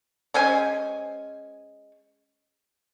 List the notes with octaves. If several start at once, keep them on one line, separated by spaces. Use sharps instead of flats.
G#3 C#4 C5 G#5